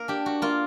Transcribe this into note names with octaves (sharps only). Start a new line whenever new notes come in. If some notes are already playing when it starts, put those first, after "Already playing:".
Already playing: A#3 A#4
D4 G4
F#4
A#3 F4